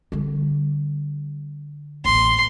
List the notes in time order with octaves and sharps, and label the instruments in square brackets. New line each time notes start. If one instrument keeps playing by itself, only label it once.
[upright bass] D3 G3
[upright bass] A1 D#2 [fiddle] C6